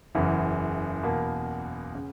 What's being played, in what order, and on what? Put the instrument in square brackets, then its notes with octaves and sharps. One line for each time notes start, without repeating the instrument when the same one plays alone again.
[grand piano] F#1 E2 C#3 E3
E2 B2 A#3
C#3